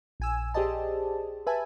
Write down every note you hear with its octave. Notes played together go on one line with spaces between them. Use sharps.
A#1 G#5 E6
G4 G#4 C5 D5 D#5 A5
B4 E5 G#5 A5